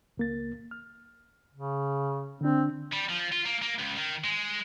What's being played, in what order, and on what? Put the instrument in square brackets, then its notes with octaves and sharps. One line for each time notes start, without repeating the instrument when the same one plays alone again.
[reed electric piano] C#2 A#3 A6
F6
[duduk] C#3
[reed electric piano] D3 D4 [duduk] C4
[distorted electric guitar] G3
F3
F4
A#3
A#3
C#2
D#3
G#3